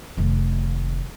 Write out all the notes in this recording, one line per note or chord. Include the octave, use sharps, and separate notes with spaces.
F1 D#3